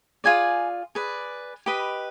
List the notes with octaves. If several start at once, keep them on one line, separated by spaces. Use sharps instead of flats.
F4 G#4 D5 G#5
G#4 B4 D5
G4 B4 D#5 B5